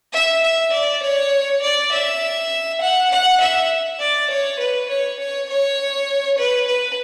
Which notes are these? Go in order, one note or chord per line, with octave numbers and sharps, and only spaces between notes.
E5
E5
D5
C#5
D5
E5
F#5
F#5
E5
D5
C#5
B4
C#5
C#5
C#5
B4
B4